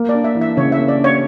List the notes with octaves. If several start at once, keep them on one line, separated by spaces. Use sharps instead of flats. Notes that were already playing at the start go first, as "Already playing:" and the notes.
Already playing: A#3
D5
D4
E5
E3
E5
C#3 C#5
E5
A#3
D5
D4
C#5